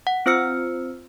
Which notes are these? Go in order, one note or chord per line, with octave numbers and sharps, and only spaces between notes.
F#5
C4 F4 C5 E6 F6 C#7